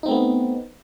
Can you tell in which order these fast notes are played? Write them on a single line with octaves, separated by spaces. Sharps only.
D#4 C4 A3 B3